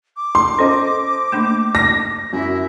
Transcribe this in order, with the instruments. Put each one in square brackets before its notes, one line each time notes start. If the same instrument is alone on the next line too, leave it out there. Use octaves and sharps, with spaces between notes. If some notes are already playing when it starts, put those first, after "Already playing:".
[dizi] D6
[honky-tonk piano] C6
[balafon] C#4 [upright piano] A4 C5 D#5
[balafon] A3 A#3 D4
[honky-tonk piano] A#6
[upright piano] F#2 [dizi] E4